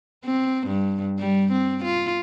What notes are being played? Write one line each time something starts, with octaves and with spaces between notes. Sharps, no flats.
C4
G2
G3
C4
F4